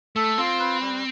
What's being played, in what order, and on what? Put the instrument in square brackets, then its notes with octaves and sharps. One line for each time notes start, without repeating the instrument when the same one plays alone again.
[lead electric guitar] A3 [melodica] A4
[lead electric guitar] C4 [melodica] F4
[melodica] B4
G3